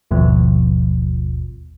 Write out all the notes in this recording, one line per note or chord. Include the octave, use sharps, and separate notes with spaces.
G#1 D#2 B2 F3